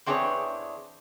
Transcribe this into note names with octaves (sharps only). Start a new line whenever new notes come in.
E2 C4 D4 G#4 B4 C#5